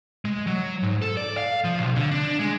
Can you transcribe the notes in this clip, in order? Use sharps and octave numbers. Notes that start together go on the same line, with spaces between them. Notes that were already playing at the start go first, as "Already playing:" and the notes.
G#3
F#3
G#2
A4
D5
F5
F3
B1
D3
D4
G#3